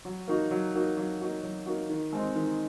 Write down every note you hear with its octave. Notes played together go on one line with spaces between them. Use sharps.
F#3
A#3 D#4 F#4
F#3
A#3 D#4 F#4
F#3
A#3 D#4 F#4
F#3
A#3 D#4 F#4
D#3
G#3 C4 D#4
D#3